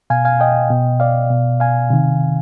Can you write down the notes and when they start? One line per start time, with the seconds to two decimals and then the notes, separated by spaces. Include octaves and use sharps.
0.10 B2 F5 G#5
0.25 F5 G#5
0.40 D#5 G5
0.70 B2
1.00 D5 F5
1.30 B2
1.60 F5 G#5
1.90 C3 D#3